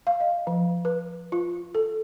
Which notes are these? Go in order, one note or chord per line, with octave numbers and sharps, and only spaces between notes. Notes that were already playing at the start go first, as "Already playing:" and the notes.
F5
D#5
F3
B4
F4
A4